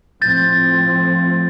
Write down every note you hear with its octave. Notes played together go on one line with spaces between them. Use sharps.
A2 F3 A3 C4 G6 A6